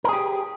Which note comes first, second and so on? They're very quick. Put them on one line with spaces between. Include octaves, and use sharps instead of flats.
A#4 G#4 G4